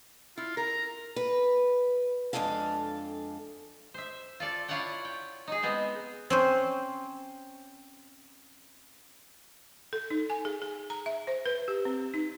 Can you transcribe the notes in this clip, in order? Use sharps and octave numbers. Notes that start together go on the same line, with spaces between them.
E4 F4
A#4 A#5
B4
F2 F3 G#3 D4 A4 F5
C5 E5
F4 A4 D5
E4 F4 C#5 D5 F#5 G5
G5
D#4 G#4
G#3 B3 C4 C5
C4 C#4 C5
A4
D#4
G#5
G#4
G#4
A#5
E5
C5
B4
G4
C4
D#4